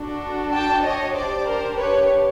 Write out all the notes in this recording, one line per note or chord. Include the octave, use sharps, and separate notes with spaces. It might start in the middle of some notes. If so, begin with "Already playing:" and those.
Already playing: D4 F#4 A4
G5 A5
C#5 D#5
D4 G4 C5 D5
A#4 C5
B4 C#5